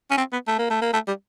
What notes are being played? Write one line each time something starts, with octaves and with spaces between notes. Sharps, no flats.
C#4
C4
B3
A3
A#3
A3
A#3
A3
G3